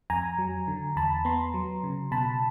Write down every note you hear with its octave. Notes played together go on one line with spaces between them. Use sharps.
F2 G#5 A#5
F#3
D3
E2 A5 B5
B3 A#5 C6
F#3
C#3
B2 A5 B5